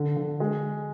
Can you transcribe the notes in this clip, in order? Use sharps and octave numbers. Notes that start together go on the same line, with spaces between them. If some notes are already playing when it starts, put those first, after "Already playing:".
Already playing: D3
D3
G#3